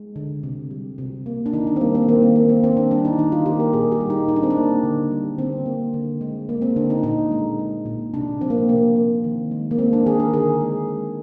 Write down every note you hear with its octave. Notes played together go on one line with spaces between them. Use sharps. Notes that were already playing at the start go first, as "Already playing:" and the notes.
Already playing: G#3
D3
C3
G3
C3
A#3
D4
D#3 D#4
D4
C4
G3 A#3
C4
D#3 A#3
C4
A#3
C4
D#3 C4
D4
G3 D4
D#4
D#3 D#4
F4
A#3 G4
A#4
A#2 G#4
G4
G3
D#4
A#2 D#4
D4
C4
D4
A#3
D3
G3
D3 C4
A#3
D3
G#3
G#3 A#3
C4
D3 D4
D#4
A#2 D#4
G#3
G#3
A#2
C3 D4
F3 C4
A#3
C3 A#3
A#3
D#3
G#3
A#3
G#3 C4
D4
D#3 G#4
A#4
D3 G#4
G#3
G#3